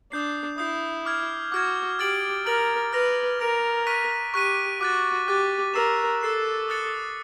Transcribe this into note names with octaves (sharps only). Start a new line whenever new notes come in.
D4 D#6 G6 C7
E4 D#6 G6 C7
D6 F6 G#6
F#4 D6 F6 G#6
G4 F6 A6 D7 F#7
A#4 F6 A6 D7 F#7
B4 F6 A#6 D7 F7
A#4 F6 A#6 D7 F7
C#6 F#6 B6 D#7
G4 C#6 F#6 B6 D#7
F#4 D6 F#6 A6
G4 D6 F#6 A6
A#4 E6 A6 C7 E7
A4 E6 A6 C7 E7
D#6 F#6 A6 C#7